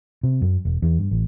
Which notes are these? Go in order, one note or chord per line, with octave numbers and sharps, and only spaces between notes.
C3
F#2
E1
E2
G2
A1